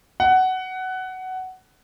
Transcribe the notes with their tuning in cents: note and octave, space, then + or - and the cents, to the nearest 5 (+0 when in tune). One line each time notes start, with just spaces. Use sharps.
F#5 +15